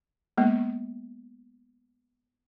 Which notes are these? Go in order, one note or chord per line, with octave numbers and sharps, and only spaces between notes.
G#3 A#3 B3